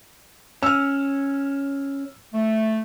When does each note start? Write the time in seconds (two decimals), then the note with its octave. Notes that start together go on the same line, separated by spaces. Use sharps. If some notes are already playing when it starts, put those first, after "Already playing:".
0.63 C#4 E6 F6
2.33 A3